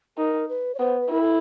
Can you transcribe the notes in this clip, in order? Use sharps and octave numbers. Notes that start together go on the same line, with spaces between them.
D#4 A#4
B4
C#5
B3 C5
B4
E4 A#4
A4